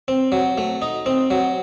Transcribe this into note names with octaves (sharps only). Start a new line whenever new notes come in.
C4
F#3
A3
D#4
C4
F#3